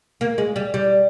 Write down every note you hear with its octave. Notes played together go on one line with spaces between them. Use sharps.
A#3
G#3
G3
G3